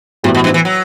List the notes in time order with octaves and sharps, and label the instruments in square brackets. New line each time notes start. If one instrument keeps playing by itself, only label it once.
[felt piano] A2 E3 G3 B3 F#4 [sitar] C3
[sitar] B2
G2
E3
F#3